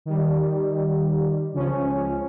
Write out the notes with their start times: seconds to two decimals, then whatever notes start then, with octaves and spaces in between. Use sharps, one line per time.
0.05 D#3 G3
1.53 C#2 F3 C#4